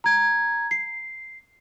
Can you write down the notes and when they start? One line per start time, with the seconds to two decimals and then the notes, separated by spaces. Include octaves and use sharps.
0.04 A#5 G#6
0.71 C7